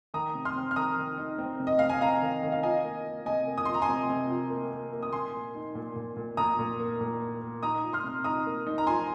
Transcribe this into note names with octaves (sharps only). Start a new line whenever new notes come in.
D#3 A#5 D#6
C3
C6 F6
C4
F6
D#3 A#5 D#6
D#3
D#4
C4
C3
D#5
C4 F5
G#5
C4 F5 A#5
D#3
D#3
F5
F4 D#5 G#5
A#3
A#3
C3 D#5 G#5
A#3
D#6
F3 C6
A#5
G#5 C6
C3
C3
F4
A#3
A#3
A#3
D#6
A#2 G#5 C6
A#3
D#4
A#2
A#2
A#2
A#2 A#5 D#6
A#2
A#3
A#2
A#3
A#3
D#4 A#5 D#6
F3
C6 F6
C3
D#4 A#5 D#6
A#3
D#4
A#5
F3 G#5 C6